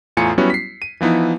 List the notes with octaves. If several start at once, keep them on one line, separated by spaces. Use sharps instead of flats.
E2 A2 F4 G#5 A#5 C#7
F#3 G3 B3 C#4 E4 F#4
B6 C7
D#7
E3 F3 B3 D#4 E4